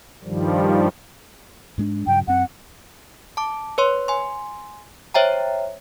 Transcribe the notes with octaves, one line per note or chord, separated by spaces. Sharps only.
G2 D#3 F3 G3
G#2 G#3 D4
G2 C#3 F#3 G5
F#2 C4 F#5
A5 D6
B4 C#5 C6
G#5 C6
C5 C#5 E5 G5 A#5